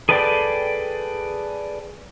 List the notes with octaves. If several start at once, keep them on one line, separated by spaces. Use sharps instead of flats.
G#4 A4 B4 D5 G5